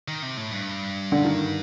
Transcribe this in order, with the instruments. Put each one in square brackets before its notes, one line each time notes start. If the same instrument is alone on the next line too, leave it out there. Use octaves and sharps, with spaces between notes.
[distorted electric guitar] D#3
C3
A2
G2
[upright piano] D3
D#3